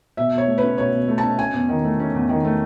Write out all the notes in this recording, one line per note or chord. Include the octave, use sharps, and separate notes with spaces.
B2 E5
B2 C#5
A3
B4
C#4
B2 C#5
B2
A3
A5
C#4
C#4 G#5
E2
D#3
A3
C#4
E2
D#3
A3